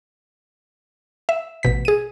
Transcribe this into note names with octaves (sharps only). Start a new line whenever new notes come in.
E5
A1 B2 B6
G#4 D#7